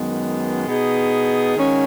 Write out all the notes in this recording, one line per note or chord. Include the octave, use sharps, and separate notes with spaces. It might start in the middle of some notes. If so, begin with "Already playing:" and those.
Already playing: F#2 D#3 G#3 B3
B2 B3 D#4 G#4
D#3 G#3 C#4 F#4